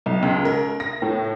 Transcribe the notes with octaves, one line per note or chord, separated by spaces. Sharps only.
B1
C#2
A#4
A#6
A2